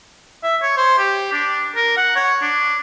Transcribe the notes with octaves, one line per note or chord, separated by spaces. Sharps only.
E5
C#5
C5
G4
D4
A#4
F#5
C#5
D4